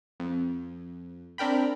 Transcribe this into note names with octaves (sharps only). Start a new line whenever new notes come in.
F2
C4 D4 A#4 G5 B5